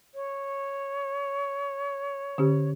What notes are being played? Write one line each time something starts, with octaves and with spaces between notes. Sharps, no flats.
C#5
D3 C#4 G4